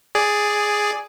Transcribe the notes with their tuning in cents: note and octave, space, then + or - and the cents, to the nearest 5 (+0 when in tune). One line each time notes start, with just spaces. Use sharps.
G#4 +0 D5 +0